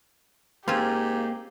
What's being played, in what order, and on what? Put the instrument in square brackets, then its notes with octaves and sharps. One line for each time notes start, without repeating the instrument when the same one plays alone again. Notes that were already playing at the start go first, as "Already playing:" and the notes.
[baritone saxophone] G#2 [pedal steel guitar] A#3 [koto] C4 C#4 F4 [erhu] G4